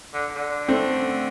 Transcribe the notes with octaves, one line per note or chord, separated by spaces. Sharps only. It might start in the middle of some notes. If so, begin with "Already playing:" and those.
D3
D3
A3 C4